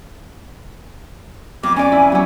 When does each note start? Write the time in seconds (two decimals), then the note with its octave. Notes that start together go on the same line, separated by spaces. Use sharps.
1.63 F2 D6
1.76 C#4 D5 G#5
1.92 E4
2.12 F#3 C#4